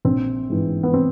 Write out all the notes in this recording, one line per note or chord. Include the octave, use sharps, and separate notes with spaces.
A#1 C4
G#2 E3
B3
C4